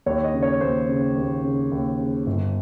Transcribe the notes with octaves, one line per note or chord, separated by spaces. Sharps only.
D#2 C#5
D#5
C#3
C#5
D#2 C5
C#3
D#2
C#3
D#2
C#3
G1